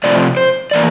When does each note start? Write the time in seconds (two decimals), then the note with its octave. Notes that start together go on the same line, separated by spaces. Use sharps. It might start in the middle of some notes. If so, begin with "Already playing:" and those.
0.04 C3 F3 A3 C4 D5
0.37 C5
0.71 E3 A#3 D5